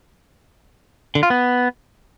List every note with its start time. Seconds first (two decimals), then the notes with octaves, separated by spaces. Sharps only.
1.15 D3
1.23 F4
1.30 B3